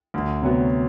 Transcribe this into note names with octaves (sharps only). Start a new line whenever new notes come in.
D2
C3 F#3 B3